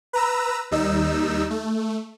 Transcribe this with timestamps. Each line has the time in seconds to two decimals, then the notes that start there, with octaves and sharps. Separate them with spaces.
0.13 B4 A#5 E6
0.71 D#2 G3 D#4 E6
1.50 A3